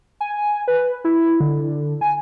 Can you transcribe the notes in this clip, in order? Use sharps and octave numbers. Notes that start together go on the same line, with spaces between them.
G#5
B4
E4
D3
G#5